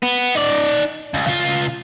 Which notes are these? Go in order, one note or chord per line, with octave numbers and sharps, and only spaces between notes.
B3
D#4 D5
C#2
C#3 F4